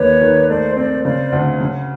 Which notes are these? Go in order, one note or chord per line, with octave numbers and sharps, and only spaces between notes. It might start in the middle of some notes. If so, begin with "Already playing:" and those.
Already playing: D#2 B3 B4 C#5
D#3
A3 C5 D5
C4 C5 D5
C#3 C5 D5
D2
C#3